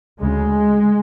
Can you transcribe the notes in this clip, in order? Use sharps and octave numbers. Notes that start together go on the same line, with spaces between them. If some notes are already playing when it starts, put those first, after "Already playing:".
D2 C#3 G#3